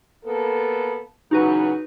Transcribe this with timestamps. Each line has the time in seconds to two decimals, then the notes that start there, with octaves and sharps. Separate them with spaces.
0.24 A#3 B3 A4
1.31 C#3 E3 F#3 D#4 F#4 B4